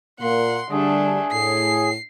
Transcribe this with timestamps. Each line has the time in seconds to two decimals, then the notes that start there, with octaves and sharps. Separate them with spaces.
0.20 A#2 A#3 F#5 C6
0.71 D3 G3 A3 D4 G#4
1.33 A2 C7